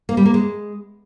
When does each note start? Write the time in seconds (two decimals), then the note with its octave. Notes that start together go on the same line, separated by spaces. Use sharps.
0.09 A#3
0.17 G3
0.26 A#3
0.34 G#3